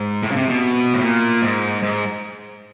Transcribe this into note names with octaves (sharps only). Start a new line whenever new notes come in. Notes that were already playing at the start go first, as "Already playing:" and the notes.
Already playing: G#2
A2
C#3
C3
B2
A2
A#2
G#2
G#2